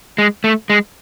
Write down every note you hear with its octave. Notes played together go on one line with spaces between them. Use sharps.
G#3
A3
G#3